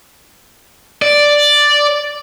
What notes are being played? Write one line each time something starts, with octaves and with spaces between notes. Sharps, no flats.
D5